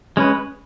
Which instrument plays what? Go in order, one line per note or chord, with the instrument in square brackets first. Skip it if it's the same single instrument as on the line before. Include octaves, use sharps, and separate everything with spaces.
[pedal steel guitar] G#3 C#4 B4